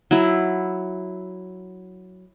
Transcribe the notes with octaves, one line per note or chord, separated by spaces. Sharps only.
F#3 E4